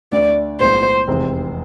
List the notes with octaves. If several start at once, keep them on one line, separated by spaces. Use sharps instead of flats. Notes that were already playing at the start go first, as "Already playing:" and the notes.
D2 D3 A3 D4 D5
B1 A2 G#3 B3 C5
F1 E2 C3 G#3 C4